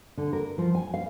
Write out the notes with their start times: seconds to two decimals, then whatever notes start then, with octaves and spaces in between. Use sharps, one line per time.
0.17 D3
0.33 A#4
0.58 F3
0.75 G#5
0.94 F5